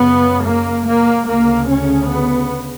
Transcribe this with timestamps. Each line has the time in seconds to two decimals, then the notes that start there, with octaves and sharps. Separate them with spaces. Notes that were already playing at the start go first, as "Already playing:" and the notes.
Already playing: F#2 C#3 B3
0.45 A#3
0.87 A#3
1.28 D2 C#3 A#3
1.70 C#4
2.11 B3